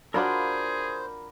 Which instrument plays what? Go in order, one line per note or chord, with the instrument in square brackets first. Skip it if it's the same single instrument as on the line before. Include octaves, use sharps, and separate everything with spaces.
[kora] D4 F4 F#4 [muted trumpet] G#4 [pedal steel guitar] A#4 B5 D6 [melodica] C5